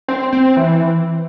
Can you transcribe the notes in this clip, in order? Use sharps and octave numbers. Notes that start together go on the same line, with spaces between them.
C4
C4
E3